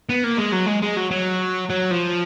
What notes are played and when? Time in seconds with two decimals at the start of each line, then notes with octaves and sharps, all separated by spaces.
0.09 B3
0.24 A#3
0.38 G#3
0.53 F#3
0.67 G#3
0.82 G#3
0.97 F#3
1.11 F#3
1.70 F#3
1.91 F3